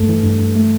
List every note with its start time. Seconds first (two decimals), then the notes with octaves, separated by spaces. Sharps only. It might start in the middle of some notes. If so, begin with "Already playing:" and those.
Already playing: G2 A3 A4
0.08 E3
0.23 G2
0.39 G2
0.55 A3